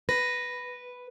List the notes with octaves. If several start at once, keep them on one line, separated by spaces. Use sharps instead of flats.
B4 A#6